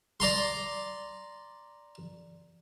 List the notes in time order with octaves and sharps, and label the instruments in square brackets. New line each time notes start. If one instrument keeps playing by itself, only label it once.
[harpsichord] D5 A#5 C6